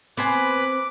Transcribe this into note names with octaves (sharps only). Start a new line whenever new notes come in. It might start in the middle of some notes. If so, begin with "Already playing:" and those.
B3 C4 B4 C5 G#5 B5 D6